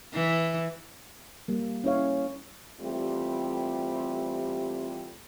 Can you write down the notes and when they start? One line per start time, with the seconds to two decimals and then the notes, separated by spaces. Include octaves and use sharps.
0.13 E3
1.48 G3 A#3
1.84 C#4 E4 C#5 F5
2.80 E2 G3 A3 C4 F4 G4